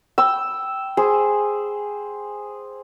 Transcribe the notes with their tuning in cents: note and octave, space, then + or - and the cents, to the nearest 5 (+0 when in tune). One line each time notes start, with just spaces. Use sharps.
G5 -10 E6 +0
G#4 -5 C5 +0